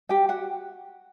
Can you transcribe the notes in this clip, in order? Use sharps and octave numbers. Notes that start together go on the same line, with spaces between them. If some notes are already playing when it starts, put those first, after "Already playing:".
G4 G5
F#4 F#5